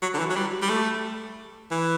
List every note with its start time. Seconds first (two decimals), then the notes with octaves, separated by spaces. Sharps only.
0.02 F#3
0.14 D3
0.19 E3
0.30 F#3
0.36 G3
0.62 G3
0.69 A3
1.71 E3